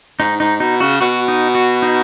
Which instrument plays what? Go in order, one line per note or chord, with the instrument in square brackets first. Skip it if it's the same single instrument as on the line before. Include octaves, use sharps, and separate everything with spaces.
[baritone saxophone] G#2 [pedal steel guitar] D#4
[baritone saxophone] G#2 [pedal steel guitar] D#4
[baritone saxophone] B2 [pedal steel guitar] D#4
[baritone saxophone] C#3 [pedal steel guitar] F#4
[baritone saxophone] B2 [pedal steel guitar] F#4
[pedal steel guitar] D#4
F#4
D#4